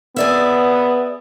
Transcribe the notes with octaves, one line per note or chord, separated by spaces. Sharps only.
B3 G#4 D5 E5